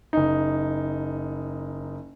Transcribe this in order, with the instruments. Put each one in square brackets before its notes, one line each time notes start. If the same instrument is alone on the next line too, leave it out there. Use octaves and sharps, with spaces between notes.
[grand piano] F#1 D#4